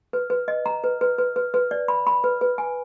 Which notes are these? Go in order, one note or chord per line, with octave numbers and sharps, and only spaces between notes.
B4
B4
D#5
A#5
B4
B4
B4
B4
B4
D5
B5
B5
B4
B4
G#5